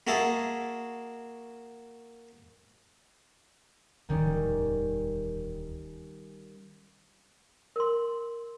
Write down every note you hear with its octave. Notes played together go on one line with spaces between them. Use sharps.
A#3 F#4 G#4 E5 A5
D1 E2 D#3 G3 C#4
A#4 C6